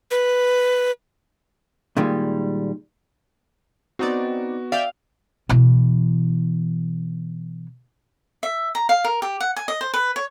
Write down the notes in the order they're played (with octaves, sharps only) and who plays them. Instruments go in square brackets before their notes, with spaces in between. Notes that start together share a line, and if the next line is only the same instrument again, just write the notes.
[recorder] B4
[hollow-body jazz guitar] A#2 D#3 G3 G#3
[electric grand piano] B3 F#4 [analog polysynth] C4 D#4 D5
[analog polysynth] D5 E5 G5 [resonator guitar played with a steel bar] F5
[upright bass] B2 E3
[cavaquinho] E5
A#5
F5
A#4
G4
F#5
G#5
D#5
C5
B4
C#5